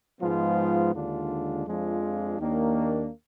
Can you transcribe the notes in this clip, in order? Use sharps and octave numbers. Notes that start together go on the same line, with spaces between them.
G#2 F3 G#3 B3 F4
D#2 D3 G#3 D4 F4
F2 F3 G#3 D4 F4
D#2 D#3 A#3 D4